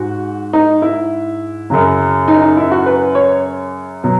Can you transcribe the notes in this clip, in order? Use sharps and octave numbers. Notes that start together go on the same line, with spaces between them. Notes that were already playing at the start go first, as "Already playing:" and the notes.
Already playing: G#2 F#4
D#4
E4
F#2 C#3 F#3
D#4
D#4
E4
F#4
B4
C#5
B2 F#3